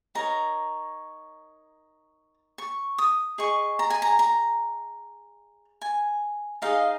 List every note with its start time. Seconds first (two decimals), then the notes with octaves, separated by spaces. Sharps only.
0.15 D#4 A#4 C#5 A#5
2.58 C#6
2.98 D#6
3.38 G#4 D#5 C#6
3.79 A#5
3.90 G#5
4.02 A#5
4.19 A#5
5.82 G#5
6.62 D#4 G#4 D#5 F5